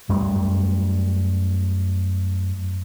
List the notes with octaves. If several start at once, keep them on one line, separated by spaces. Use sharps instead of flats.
F#2 G3 A3